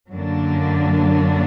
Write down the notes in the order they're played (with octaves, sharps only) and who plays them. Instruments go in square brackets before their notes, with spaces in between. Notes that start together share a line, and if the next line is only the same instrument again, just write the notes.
[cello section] F#2 D3 F#3 A#3 D4